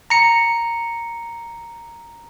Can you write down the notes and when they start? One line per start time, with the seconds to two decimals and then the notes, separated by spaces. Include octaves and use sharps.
0.10 A#5 C#7